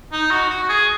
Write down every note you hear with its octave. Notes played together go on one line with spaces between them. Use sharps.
D#4
F#4
F#4
F#4
G#4